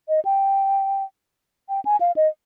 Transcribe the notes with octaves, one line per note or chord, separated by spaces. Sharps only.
D#5
G5
G5
G#5
F5
D#5